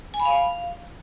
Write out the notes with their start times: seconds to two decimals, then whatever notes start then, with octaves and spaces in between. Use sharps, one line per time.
0.14 G#5
0.20 B5
0.25 F5